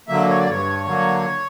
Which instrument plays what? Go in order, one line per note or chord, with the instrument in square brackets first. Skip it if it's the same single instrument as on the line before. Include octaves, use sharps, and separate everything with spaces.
[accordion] D3 F#3 A#3 E5
C#5
D5
G2 C#5
D3 F#3 A#3